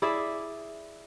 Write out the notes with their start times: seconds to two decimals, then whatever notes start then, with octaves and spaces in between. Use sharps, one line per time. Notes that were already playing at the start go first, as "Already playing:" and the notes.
0.02 E4 G#4 D5 E5